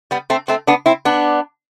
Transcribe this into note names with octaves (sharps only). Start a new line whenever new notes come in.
G3 B3
A3 C4
A3 C4
B3 D4
C4 E4
B3 D4